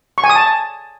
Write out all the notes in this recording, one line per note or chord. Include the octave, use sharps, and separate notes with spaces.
C#6
G#5
D#6
A5